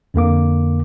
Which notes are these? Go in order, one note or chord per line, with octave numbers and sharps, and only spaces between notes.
F2 D3 A#3 D6